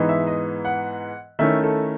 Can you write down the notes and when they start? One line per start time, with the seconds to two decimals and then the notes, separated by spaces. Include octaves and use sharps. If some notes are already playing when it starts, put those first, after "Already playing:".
Already playing: G#2 E3 B3 D#4
0.09 E5
0.27 D#5
0.65 F#5
1.39 D#3 A3 C#4 E4 E5
1.63 A4